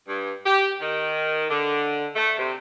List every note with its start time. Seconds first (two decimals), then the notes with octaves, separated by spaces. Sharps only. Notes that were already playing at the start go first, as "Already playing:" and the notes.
0.09 G2
0.45 G4
0.80 D#3
1.50 D3
2.16 A3
2.38 C3